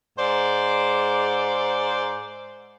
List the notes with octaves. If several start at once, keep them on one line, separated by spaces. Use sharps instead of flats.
G#2 C5 D5